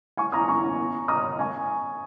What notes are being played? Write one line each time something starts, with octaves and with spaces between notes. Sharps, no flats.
G#5 C#6
A#5 D#6
G#5 C#6
A#5 D#6
G#5 C#6